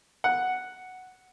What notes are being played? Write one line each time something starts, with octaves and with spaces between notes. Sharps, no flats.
F#5